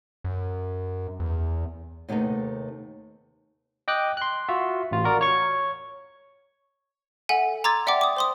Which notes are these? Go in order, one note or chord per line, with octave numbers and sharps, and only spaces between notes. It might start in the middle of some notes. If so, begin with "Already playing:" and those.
F#2
E2
D#2 C3 A3 B3 D#4
D#5 G5 D6 F#6
C6 F#6
F4 F#4 E5
A1 F4
F#4 A#4 D5
C#5 C#6
A4 E5 F#5 G#5
A#5 C6 D6 E6 G#6 A6
D5 E5 F#5 G5 C6 D6
D6 D#6
C5 C6 D#6